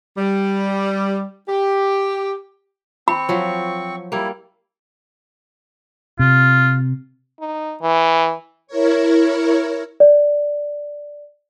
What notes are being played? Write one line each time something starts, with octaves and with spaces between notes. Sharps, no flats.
G3
G4
C4 B5 C#6
F3 F#3
G3 A#3 E4
C3 F4
D#4
E3
E4 A#4 C#5
D5